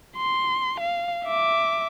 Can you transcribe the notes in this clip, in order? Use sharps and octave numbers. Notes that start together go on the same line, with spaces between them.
C6
F5
E5 D6